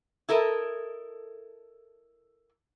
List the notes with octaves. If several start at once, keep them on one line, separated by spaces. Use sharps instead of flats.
E4 A4 A#4 D#5